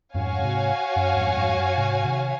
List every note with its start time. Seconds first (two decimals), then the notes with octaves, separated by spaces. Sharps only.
0.15 F2 G#2 F#4 C#5 F5 G#5
0.41 G#2 C3
0.96 F#2
1.16 F2 G#2
1.36 F2 G#2
1.57 F#2
1.78 G#2 C3
2.04 C3 D#3